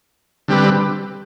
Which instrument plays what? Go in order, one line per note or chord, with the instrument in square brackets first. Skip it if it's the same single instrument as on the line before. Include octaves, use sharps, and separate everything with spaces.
[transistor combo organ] D3 G3 C4 G4 B4